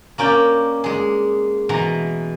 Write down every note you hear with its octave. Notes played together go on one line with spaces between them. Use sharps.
A#3 C#4 D5 G5
G#3 G#4
B2 E3 A#5